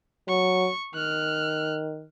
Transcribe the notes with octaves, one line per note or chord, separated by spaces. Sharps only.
F#3 C#6
D#3 F6 F#6